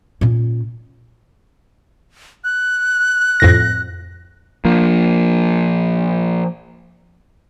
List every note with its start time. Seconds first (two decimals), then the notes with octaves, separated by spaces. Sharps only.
0.21 A#2 C#4
2.44 F#6
3.40 F2 A2 A#6
4.65 F3 A#3